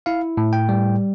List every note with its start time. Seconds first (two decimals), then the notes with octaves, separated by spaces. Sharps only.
0.06 E4 F5
0.37 A2
0.53 G5
0.69 G3